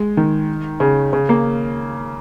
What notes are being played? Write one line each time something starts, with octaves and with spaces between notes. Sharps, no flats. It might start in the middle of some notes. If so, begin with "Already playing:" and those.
Already playing: G#3
D#3
C#3
C#3
A#3